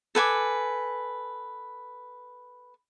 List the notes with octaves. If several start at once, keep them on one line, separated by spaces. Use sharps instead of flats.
A4 B4 G#5 D6